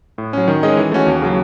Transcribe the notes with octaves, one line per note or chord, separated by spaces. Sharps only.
A2
F#3 C#4
D#3
G#3 C#4 G#4 D#5
E3
A3 C#4 F#4
D#2
C#3 F#3